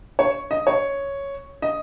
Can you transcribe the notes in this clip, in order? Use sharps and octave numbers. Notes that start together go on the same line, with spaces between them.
C#5
D#5
C#5
D#5